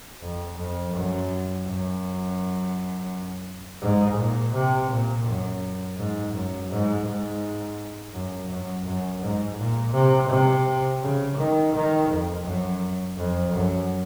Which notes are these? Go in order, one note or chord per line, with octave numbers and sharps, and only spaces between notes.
F2
F2
F#2
F#2
G#2
A#2
C3
A#2
F#2
G#2
F#2
G#2
G#2
F#2
F#2
F#2
G#2
A#2
C3
C3
C#3
D#3
D#3
F2
F#2
F2
F#2